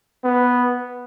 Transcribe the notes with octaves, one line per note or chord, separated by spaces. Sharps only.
B3